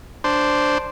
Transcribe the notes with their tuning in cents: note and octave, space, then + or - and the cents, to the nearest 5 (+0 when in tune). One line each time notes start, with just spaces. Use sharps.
D4 +0 C5 +0